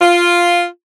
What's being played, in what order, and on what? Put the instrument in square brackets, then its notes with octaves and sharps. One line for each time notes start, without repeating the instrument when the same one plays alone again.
[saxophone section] F4